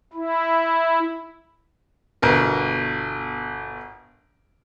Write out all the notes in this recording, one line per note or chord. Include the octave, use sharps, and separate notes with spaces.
E4
G1 B2 A#4